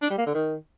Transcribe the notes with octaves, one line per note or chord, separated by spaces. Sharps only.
D4
G3
A#3
D3
D#3